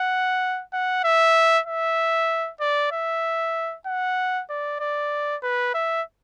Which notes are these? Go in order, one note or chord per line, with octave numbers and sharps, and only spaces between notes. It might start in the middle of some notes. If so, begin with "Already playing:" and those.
Already playing: F#5
F#5
E5
E5
D5
E5
F#5
D5
D5
B4
E5